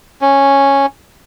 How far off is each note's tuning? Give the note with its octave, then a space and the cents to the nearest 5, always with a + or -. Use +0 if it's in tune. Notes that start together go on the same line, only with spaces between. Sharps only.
C#4 -5